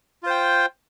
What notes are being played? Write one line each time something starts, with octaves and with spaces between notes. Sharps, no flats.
F4 C5 G5